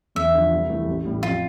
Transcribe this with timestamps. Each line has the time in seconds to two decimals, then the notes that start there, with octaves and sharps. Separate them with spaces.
0.15 E2 E5
0.34 D3 F3
0.52 C2
0.70 C3 E3 A3
0.87 A1
1.05 A2 G3
1.23 F2 F4